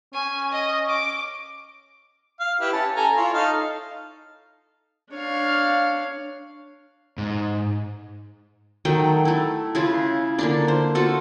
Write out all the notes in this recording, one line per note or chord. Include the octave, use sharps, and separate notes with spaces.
C#4 G#5
D#5
D6
F5
E4 G4 B4
C#4 A5
A4 G#5 A#5
E4 F4 C#5
D#4 A4 F5
D4 C#5 F5
G#2
D#3 F#3 A3 G5
A3 E4
C#3 E4 F4
D3 A#3 D4
C5
F4 F#4 A4